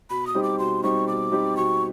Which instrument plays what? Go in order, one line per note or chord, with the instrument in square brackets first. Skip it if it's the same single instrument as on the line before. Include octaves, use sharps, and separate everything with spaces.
[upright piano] B2 [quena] B5
[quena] D#6
[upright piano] G3 C4 D#4 G4
[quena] D6
[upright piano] B2 [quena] C6
[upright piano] G3 C4 D#4 G4 [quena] C#6
[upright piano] B2 [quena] D6
[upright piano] G3 C4 D#4 G4
[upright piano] B2 [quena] C#6